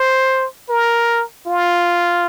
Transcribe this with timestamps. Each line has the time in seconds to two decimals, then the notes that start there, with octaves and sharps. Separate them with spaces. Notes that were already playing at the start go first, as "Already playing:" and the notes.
Already playing: C5
0.69 A#4
1.47 F4